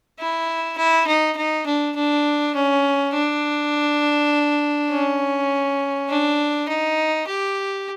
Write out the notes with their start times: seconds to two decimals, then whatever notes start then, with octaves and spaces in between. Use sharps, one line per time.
0.19 E4
0.77 E4
1.07 D#4
1.36 D#4
1.66 D4
1.96 D4
2.54 C#4
3.14 D4
4.91 C#4
6.09 D4
6.68 D#4
7.27 G4